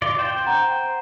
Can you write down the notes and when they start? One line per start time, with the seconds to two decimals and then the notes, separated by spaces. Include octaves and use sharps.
0.02 F4 D5
0.19 C5 G5
0.47 F#5 A#5